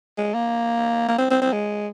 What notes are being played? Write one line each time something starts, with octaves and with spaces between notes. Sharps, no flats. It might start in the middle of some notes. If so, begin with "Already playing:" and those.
G#3
A#3
A#3
C4
C4
C4
G#3